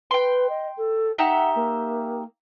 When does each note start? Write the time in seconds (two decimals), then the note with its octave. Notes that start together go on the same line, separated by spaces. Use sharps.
0.11 B4 G5 C6
0.49 D#5
0.77 A4
1.18 D#4 G4 E5 F#5
1.55 A#3